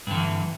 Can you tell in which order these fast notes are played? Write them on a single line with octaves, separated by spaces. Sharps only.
G2 D3 E3